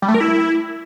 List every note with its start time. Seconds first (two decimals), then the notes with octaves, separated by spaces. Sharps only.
0.02 G3
0.08 A3
0.14 A#4
0.20 E4